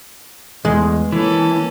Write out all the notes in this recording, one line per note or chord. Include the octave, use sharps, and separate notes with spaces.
E2 G#3
E3 A#3 C#4 A4